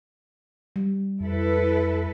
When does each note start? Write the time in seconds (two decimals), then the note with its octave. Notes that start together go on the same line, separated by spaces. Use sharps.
0.76 G3
1.20 F2 E4 A4 B4